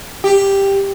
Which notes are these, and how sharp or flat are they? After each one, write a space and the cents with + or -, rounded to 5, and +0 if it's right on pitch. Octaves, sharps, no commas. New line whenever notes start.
G4 +5